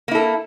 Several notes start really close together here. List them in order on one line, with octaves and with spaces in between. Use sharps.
A#3 E4 A4